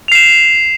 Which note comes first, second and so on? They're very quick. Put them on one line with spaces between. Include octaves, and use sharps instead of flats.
F7 C7 E7